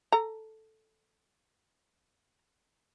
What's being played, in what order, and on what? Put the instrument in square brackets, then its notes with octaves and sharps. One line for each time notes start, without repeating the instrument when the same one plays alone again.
[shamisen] A4 A#5